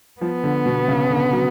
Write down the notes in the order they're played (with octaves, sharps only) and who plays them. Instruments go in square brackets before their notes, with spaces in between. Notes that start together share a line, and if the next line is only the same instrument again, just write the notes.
[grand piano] F3 [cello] B3
[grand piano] D3
B2
C#3
D3
F#3